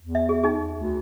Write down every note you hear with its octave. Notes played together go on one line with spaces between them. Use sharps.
E2
E5
G#4
D#4 G#4
D2